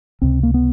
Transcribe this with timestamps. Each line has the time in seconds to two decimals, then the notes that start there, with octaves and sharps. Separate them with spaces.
0.22 C#2 C3 C4
0.43 A#3
0.54 B3